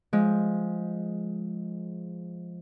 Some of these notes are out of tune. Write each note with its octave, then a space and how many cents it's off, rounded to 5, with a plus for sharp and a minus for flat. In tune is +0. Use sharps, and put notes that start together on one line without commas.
F3 +0 G#3 +5